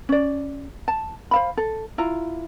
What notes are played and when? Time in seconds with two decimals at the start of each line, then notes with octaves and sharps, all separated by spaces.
0.09 C#4 D5
0.88 A5
1.31 C5 F5 B5
1.57 A4
1.98 E4 F4 A#5